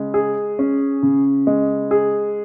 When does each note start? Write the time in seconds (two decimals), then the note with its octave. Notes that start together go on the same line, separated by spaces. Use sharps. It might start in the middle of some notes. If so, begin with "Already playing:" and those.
Already playing: C#3 G#3
0.14 G#4
0.59 C#4
1.03 C#3
1.47 G#3
1.91 G#4